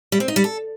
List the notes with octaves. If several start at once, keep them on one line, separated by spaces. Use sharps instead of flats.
G3
C4
D#4
G3
A4